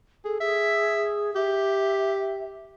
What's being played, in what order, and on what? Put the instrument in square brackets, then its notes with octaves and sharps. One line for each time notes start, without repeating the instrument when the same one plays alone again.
[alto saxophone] G#4 [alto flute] A4
[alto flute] G#4 [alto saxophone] E5
[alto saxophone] G4 [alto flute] E5